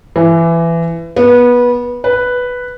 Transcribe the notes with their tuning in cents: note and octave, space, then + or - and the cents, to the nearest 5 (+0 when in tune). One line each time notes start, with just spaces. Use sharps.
E3 +20
B3 -20
B4 +0